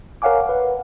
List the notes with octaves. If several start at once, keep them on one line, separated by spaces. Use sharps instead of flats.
A#4 C#5 F5 F#5 G#5 D6
B4 F#5